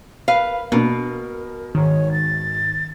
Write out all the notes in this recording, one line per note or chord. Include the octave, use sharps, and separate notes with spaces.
A#4 B4 F5
B2 A#3 B3 D4
G#2 D#3 C#5
A6